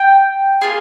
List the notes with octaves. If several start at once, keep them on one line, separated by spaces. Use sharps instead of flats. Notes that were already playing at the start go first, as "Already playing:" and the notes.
Already playing: G5
A#3 F4 G#4